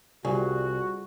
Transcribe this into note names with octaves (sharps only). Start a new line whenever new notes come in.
C2 G3 F4 F#4 G#4 D5 G#5 C#6